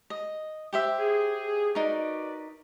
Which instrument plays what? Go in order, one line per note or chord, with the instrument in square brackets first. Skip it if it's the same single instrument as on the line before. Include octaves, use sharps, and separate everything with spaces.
[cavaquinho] D#5
G4 C5 E5
[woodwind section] G#4
[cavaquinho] D#4 A#4 [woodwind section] F#4 B4 D5